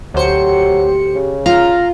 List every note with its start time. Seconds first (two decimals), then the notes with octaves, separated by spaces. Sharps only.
0.14 D2 F#3 G4 C5 C#7
1.15 C#3
1.46 F4 F5 A#5 F6